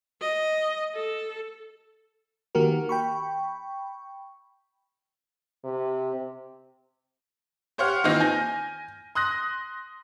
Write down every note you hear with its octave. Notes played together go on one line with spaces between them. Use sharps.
D#5
A4
D#3 A#3 F#4 G4 A#4
G5 B5 C#6
C3
G4 C5 C#5 F5 F#5 F6
D#3 E3 A#3 C4 D#4 F4
G#5 G6 A#6
C6 D#6 F#6 A#6